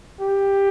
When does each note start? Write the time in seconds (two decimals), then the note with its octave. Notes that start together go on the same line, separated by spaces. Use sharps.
0.21 G4